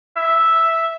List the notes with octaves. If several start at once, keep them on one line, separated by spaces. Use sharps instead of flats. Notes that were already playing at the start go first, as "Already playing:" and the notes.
E5